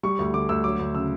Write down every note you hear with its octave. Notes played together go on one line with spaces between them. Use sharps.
G3 C#6
D2
D3 D6
D2 E6
F#3 D6
D2
C#3 E6